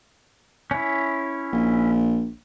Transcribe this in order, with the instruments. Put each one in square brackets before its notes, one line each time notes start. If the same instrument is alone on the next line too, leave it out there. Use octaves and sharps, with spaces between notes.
[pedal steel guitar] C#4 E4
[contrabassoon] A#1